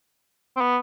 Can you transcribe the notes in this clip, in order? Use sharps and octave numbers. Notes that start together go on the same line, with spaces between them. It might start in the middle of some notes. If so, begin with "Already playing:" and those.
C4
B3